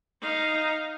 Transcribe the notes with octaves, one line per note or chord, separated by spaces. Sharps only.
D#4 F5